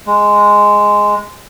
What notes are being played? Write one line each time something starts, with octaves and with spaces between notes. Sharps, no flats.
G#3